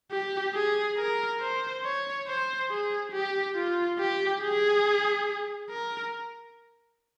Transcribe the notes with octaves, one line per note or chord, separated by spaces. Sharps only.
G4
G#4
A#4
C5
C#5
C5
G#4
G4
F4
G4
G#4
A#4